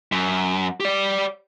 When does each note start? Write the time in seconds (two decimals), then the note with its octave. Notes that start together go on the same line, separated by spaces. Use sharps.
0.12 F#2
0.80 G4 D5